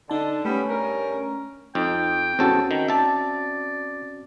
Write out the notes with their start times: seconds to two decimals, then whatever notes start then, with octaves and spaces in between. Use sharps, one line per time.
0.09 D3 D#4 A5
0.45 G3 A3 B3 C#4
0.69 G2 A#4
1.75 F2 D#4 G5
2.39 E2 C4 C#4 F#4 A4
2.71 D#3 G5
2.88 D5 E5 A5